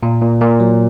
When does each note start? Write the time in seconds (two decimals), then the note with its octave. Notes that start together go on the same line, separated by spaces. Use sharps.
0.03 A#2
0.22 A#2
0.41 A#2
0.60 F#3